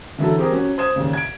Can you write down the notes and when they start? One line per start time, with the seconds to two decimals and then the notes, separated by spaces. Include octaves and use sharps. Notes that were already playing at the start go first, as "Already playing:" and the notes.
0.18 D3 E3 F#3 A4
0.38 C4 G4 G#4 A#4
0.51 F#3 C#4 F#4
0.78 C5 D#6 G#6 E7
0.96 D#2 A#2 C#3
1.13 G#6 D7